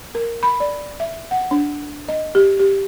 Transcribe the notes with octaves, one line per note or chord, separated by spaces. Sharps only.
A#4
B5
D5
E5
F#5
D4
D#5
G4
G4